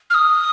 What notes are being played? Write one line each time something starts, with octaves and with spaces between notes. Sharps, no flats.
F6
D#6